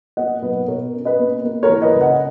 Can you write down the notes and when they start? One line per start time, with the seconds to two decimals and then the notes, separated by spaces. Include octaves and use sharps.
0.17 A#3 D#5 F#5
0.42 B1 B4 D#5
0.67 B2 A#4 C#5
0.93 C#4
1.05 B4 D#5
1.19 A#3
1.45 A#3
1.63 A#4 C#5
1.69 E3
1.82 B4 D#5
1.96 C#2
2.01 D#5 F#5